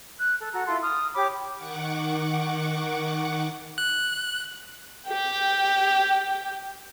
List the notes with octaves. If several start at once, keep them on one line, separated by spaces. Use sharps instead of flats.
F#6
A4
F#4 A4 A#5
E4 F4 A4 C6
D#6 F6
G4 C#5 B5 D6
D#3 F#5 C#6 D6
F#6
G4 G5